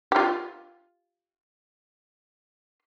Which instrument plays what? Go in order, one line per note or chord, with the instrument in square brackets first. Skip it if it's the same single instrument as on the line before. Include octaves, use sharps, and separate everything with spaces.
[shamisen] F4 G4